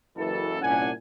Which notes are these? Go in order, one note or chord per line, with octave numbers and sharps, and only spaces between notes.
F#1 E3 A4
C2 A#2 C#4 D4 F#5 G#5